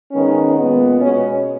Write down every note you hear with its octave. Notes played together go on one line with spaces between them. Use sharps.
G#2 D#3 G#3 B3 C#4
A#2 G#3 B3
B2 G#3 B3 C#4